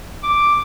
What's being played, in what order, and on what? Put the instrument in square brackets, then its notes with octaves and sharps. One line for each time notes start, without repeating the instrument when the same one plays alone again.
[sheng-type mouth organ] D6